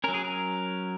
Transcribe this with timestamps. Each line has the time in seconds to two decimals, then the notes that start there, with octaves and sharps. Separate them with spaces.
0.04 F#3 C#4 A#4
0.14 G#4
0.25 A#4